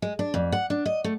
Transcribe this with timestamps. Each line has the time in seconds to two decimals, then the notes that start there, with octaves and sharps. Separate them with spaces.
0.02 G#3
0.19 D4
0.34 F2
0.52 F#5
0.70 D4
0.86 D#5
1.04 A3